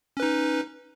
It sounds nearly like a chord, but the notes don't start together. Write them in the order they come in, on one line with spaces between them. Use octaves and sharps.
C#4 B4 D#4